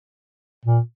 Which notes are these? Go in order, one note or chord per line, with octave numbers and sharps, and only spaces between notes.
A#2